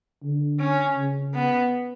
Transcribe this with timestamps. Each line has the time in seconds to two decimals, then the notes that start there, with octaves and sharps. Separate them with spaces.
0.23 D3
0.60 C#4
0.97 C#3
1.35 B3